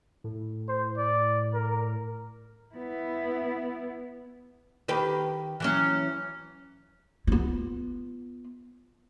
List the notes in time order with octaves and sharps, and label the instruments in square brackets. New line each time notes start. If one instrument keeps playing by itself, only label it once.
[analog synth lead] A2
[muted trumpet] C5
D5
A#4
[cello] B3 E4
[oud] D#3 G4 B4
E3 F#3 C#4
[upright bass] B3 F4